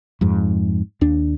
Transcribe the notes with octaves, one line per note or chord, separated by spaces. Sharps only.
F2 G#2
D#2 D4